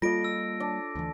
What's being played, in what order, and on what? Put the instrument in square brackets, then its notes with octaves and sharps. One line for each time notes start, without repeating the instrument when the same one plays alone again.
[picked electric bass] G3 A#3 [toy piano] F4 [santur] A4 D#5 [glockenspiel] A#6 D7
[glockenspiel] E6
[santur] D4
[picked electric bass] D2 E3